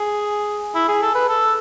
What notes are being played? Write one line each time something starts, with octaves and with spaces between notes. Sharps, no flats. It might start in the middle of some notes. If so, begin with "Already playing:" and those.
Already playing: G#4
E4
G#4
A4
B4
A4